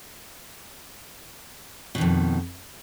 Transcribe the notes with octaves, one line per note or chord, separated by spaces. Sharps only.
F2 B2 D#3